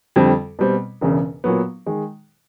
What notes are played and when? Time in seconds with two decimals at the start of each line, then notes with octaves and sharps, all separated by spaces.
0.16 F2 D3 G3 C4
0.59 B2 G3 C4
1.01 E1 E2 C#3
1.44 A#2 F#3 B3
1.86 D#3 G#3